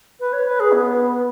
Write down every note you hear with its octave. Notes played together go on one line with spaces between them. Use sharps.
B4
C#5
B4
G#4
B3